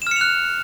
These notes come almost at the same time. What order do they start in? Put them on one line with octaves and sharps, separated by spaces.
E7 F6 C#7 F7 F#6